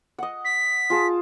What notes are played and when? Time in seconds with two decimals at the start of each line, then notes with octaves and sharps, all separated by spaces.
0.18 D#5 F#5
0.45 B6
0.90 F4 G#4 A5